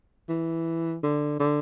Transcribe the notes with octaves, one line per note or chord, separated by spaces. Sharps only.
E3
D3
D3